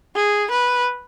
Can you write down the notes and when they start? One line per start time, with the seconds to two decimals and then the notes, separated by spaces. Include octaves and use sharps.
0.16 G#4
0.51 B4